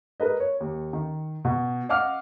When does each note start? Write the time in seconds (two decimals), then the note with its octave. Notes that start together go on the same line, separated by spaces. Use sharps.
0.20 A#4 B4 D#5
0.40 C#5
0.60 D#2
0.93 D#3
1.45 B2
1.89 D#5 F5 F#5 D6 F6